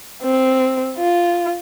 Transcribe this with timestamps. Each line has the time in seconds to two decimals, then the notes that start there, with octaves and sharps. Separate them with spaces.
0.23 C4
0.98 F4